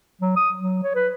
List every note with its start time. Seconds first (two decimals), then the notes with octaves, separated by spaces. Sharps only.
0.21 F#3
0.36 D#6
0.59 F#3
0.83 C#5
0.95 B4